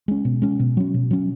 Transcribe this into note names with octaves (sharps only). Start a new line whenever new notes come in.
G#3 C#4
B2
G#3 C#4
B2
F#3 C#4
B2
F#3 C#4